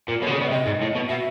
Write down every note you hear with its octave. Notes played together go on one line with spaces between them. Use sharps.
A#2
B2 C#5
D3
C#3
D5
B2
E5
C3 D#5
G#2
A2
B2
B2 E5